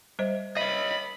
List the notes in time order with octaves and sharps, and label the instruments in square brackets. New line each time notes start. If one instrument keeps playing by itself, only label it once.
[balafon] G3 C5 D#5
[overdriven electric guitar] C#5 D#5 [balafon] E5 [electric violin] B5